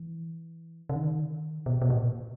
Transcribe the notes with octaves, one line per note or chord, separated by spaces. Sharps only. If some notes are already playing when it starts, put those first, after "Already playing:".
Already playing: E3
C#3
D#3
B2
B2
A#2